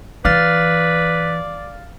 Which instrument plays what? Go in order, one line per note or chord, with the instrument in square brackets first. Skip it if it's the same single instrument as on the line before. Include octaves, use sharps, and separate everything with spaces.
[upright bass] E3 [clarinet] B4 [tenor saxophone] D5 [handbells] F5 F6 A6